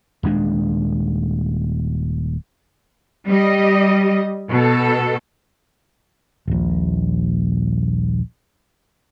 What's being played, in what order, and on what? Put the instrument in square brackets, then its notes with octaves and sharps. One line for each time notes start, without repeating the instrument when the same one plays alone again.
[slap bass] D#1 D#2 G#3 D4
[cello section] G3 D#5
B2 A4
[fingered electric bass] D#1 A#1